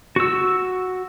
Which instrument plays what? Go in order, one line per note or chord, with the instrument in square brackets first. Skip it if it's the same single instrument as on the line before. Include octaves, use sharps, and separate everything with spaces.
[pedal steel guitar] F#4 E6